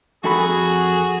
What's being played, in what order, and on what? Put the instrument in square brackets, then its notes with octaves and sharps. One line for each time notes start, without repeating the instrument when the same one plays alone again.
[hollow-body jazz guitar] F2 A4 B5 [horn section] F#4 G#4